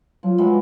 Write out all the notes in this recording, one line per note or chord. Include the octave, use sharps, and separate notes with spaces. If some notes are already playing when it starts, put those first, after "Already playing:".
F3 F#3
E3 F#3 G#3